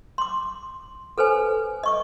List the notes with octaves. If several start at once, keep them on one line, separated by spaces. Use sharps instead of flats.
C6 D6
A4 B4 C5 G#5
D#5 C#6 D6